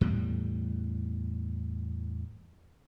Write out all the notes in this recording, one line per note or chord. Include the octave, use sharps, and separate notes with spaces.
E2 A2 G3